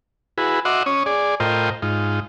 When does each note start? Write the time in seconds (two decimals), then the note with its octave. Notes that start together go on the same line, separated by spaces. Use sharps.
0.38 E4 F#4 G#4 B4
0.65 F#4 D#5 E5 F#5 C6 D6
0.86 C#4 C#5 D#6
1.06 G#4 D5
1.40 A2 F4 A#4 C5 D#5 G5
1.82 G#2 D#4 F4